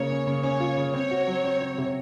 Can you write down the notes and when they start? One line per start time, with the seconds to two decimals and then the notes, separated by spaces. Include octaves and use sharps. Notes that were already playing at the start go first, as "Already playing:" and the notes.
Already playing: C#3 A#3 C#5
0.10 C#4
0.27 C#3
0.43 C#4 C#5
0.60 F4
0.77 C#3
0.94 C4 C#5
1.11 F#4
1.27 F#3
1.44 C4
1.61 C4
1.78 C3